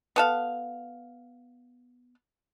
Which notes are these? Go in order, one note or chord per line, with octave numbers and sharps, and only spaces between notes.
B3 A4 F5